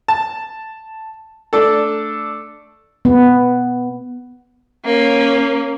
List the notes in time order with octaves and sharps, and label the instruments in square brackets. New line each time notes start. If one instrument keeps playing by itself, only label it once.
[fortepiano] A5
A3 D4 A4
[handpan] B3
[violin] A#3 C#4